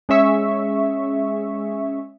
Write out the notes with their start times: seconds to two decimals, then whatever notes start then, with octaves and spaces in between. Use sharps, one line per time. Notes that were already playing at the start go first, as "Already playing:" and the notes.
0.09 G#3 C#4 G#4 E5 C#6